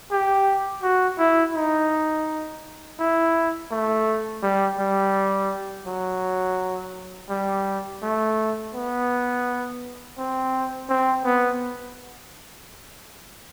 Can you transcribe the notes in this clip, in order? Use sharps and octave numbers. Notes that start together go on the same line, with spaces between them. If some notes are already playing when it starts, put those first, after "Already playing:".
G4
F#4
E4
D#4
E4
A3
G3
G3
F#3
G3
A3
B3
C4
C4
B3